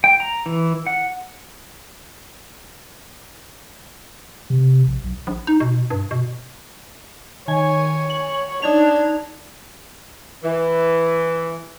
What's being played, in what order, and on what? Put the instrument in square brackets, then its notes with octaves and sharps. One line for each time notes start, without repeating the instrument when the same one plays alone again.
[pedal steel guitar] G5
A#5
E3
F#5
[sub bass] C3
A#1
B1
[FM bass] A#1
D#4
B2
G2
B2
[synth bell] D#3 G#5 [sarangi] C#5
[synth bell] F#7
[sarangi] D4 [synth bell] D#4 G#6 F7
[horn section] E3